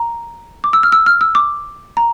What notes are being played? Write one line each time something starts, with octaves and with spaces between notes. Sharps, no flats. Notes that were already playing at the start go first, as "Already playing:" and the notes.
Already playing: A#5
D6
E6
F6
E6
F6
E6
D6
A#5